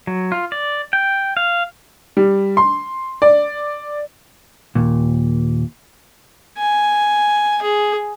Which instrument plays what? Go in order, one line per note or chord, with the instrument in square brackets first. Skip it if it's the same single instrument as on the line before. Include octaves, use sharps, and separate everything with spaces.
[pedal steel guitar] F#3
F4
D5
G5
F5
[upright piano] G3
C6
D5
[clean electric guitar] D#2 A#2
[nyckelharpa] G#5
G#4